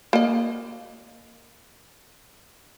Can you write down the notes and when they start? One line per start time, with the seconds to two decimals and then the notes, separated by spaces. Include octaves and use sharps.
0.13 A#3 D#5